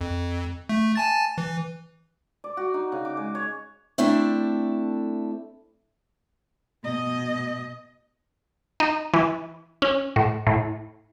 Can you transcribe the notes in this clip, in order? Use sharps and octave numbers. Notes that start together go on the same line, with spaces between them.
F2
A3
G#5 A5 A6
E3
D5
F#4
D#4
C#3
D6
G#3
C#5
A3 C4 D4 E4 A4
B2 D#5
D#4
E3
C#4
A2
A2